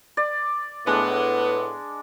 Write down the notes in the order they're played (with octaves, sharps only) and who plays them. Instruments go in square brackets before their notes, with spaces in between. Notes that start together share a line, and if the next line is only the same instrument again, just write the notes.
[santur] D5
[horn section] A2 B3 [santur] G#3 D4